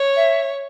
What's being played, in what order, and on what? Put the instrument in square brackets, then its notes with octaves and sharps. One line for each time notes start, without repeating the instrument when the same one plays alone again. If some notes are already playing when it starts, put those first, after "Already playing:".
Already playing: [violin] C#5
[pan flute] E5